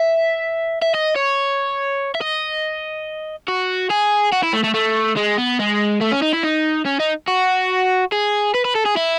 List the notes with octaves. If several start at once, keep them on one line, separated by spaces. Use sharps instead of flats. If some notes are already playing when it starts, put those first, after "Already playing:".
Already playing: E5
E5
D#5
C#5
E5
D#5
F#4
G#4
F#4
E4
A3
A3
A3
G#3
B3
G#3
A3
C#4
D#4
E4
D#4
C#4
D#4
F#4
G#4
B4
B4
A4
G#4
E4